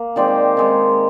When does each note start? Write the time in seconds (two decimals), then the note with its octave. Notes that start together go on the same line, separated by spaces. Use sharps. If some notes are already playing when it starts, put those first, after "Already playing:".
Already playing: A#3
0.16 D#3 G#3 C4 C5 D5
0.57 D#3 G#3 C4